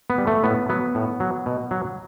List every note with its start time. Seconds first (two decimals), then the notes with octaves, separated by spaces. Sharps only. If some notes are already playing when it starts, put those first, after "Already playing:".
0.10 B3
0.18 G3
0.27 A3
0.44 A2 B3
0.69 F#3 B3
0.95 A2
1.20 F#3
1.46 B2
1.71 F#3